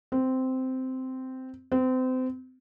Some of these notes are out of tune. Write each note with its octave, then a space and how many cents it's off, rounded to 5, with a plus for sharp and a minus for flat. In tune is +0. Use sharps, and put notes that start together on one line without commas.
C4 -10
C4 -30